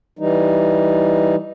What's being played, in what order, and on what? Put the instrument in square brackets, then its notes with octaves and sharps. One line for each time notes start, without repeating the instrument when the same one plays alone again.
[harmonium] E3 G3 D#4